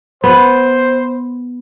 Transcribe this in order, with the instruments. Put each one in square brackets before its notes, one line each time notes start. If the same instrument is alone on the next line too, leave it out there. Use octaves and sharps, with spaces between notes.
[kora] B3 [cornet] C5